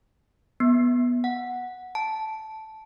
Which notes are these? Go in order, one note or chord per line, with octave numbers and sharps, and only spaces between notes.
B3
F#5
A5